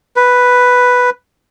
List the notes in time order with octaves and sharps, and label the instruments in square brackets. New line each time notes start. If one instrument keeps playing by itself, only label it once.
[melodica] B4